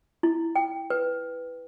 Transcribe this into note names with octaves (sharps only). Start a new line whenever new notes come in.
E4
G5
B4